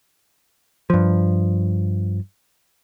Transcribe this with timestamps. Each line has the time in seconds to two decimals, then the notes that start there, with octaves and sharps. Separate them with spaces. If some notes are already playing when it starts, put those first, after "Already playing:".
0.90 G2 F3